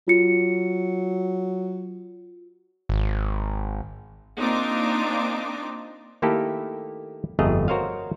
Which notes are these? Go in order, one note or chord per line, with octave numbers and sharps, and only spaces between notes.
F#3 F4 C#7
G#1
A#3 C4 D4 D#4 F4 D6
D#3 A3 A#3 E4 G4 A4
G1 F2 A3 G#4 D#5 A#5
F#4 A#4 C5 C#5 D#5 F5